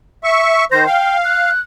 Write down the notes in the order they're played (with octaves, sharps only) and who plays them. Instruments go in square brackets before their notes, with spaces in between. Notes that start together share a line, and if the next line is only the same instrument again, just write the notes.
[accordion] E5 C#6
[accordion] D#3 C5 [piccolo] A#6
[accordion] F5 [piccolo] G5
[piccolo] F#6